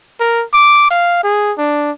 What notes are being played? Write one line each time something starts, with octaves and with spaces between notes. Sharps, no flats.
A#4
D6
F5
G#4
D4